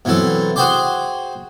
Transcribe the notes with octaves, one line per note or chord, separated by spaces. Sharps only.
B2 E3 F#3 C4 A4
F#4 G#4 C5 G5 C6 D6